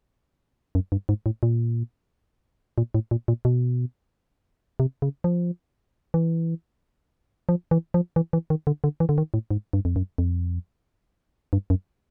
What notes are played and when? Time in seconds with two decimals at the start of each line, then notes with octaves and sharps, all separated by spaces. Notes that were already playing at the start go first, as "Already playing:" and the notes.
0.75 F#2
0.92 G2
1.09 G#2
1.26 A2
1.43 A#2
2.78 A#2
2.95 A2
3.11 A#2
3.28 A#2
3.45 B2
4.80 C3
5.02 C#3
5.24 F3
6.14 E3
7.49 F3
7.71 E3
7.94 F3
8.16 E3
8.33 E3
8.50 D#3
8.67 D3
8.84 D3
9.00 E3
9.09 D3
9.18 D#3
9.34 A2
9.51 G#2
9.73 G2
9.85 F2
9.96 F#2
10.18 F2
11.53 G2
11.70 F#2